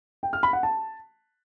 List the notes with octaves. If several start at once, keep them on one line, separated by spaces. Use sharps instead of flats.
G5
F6
B5
F#5
A5